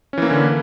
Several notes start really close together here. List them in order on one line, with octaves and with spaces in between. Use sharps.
C#4 E3 A#3 E4 D3